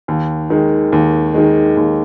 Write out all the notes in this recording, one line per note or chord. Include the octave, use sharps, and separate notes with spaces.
D#2
D#3 G#3
D#2
D#3 G#3
D#2